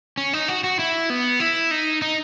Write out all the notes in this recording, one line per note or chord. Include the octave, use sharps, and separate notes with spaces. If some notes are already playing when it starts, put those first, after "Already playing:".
C#4
D#4
F#4
F#4
E4
B3
E4
D#4
D#4